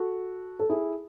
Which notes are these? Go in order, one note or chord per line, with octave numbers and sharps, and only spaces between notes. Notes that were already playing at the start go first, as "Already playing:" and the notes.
Already playing: F#4 A4
A4
E4 G#4